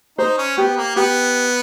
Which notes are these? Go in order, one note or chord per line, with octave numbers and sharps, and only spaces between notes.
D#4 C5
C#4
B3 G4
A#3
B3 G4